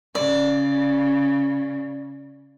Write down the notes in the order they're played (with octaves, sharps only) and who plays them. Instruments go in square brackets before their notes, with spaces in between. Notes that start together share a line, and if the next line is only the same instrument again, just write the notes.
[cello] C#3 [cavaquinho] D5